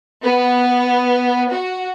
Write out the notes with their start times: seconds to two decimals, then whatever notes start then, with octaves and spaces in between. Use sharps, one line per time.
0.21 B3
1.53 F#4